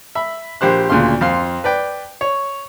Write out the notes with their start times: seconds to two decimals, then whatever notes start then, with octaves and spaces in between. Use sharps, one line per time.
0.15 E5 B5
0.61 A#1 G4 C5 F#6
0.89 D2 A#2 C#3 F5 C6
1.21 F2 F5 C6
1.64 B4 D5 G5
2.21 C#5